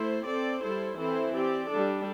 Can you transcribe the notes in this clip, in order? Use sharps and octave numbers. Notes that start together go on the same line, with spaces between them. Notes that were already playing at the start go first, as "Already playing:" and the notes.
Already playing: A3 E4 C5
C4 A4 D5
G3 E4 A4 C5
E3 C4 E4 A4 C5
C4 G4 D5
G3 D4 A4